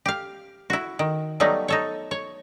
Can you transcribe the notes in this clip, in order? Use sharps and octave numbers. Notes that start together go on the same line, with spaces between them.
G4 F5
E4 F#4
D#3
F#3 G3 A3 B3 D#4
D#4 A4 C#5
C#5